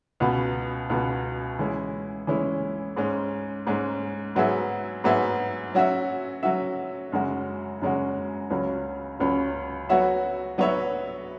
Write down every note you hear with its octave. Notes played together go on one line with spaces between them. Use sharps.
C#2 B2 B3 F#4
C#2 B2 B3 F#4
E3 G#3 C#4 E4
E3 G#3 C#4 E4
G#2 G#3 C#4
G#2 G#3 C#4
G#2 F#3 B3 G#4 E5
G#2 F#3 B3 G#4 E5
F#3 C#4 F#4 E5
F#3 C#4 F#4 E5
F#2 C#3 G#3 C#4 F#4
F#2 C#3 G#3 C#4 F#4
C#2 C#3 F#3 C#4
C#2 C#3 F#3 C#4
F#3 B3 F#4 C#5 E5
F#3 B3 F#4 C#5 E5